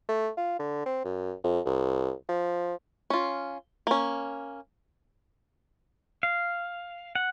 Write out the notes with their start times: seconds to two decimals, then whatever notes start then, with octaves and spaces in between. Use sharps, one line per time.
0.09 A3
0.37 F4
0.59 D3
0.86 C4
1.04 F#2
1.44 F2
1.66 C2
2.29 F3
3.10 C#4 F4
3.87 A#3 C#4
6.23 F5
7.15 F#5